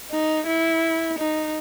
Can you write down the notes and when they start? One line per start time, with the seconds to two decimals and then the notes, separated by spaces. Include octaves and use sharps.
0.10 D#4
0.46 E4
1.18 D#4